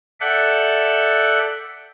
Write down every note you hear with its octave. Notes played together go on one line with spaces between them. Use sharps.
A4 D5 E5 F#5 G5 F#6